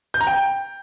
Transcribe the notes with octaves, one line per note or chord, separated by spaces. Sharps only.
G6
A#5
G5